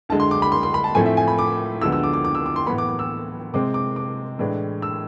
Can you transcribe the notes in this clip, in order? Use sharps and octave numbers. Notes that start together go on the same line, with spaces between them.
D2 D3 G#3 A5
C6
D6
B5
C6
C6
B5
A5
A2 F3 A3 C4 G#5
E5
G#5
B5
D6
D2 D3 F3 G#3 B3 E6
E6
D6
D6
D6
E6
D6
C6
A2 E3 B3 B5
D6
D6
E6
C3 G#3 C4 D6
D6
D6
A2 E3 G#3 D4
E6